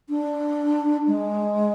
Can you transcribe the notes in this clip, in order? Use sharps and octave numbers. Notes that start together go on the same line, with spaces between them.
D4
G#3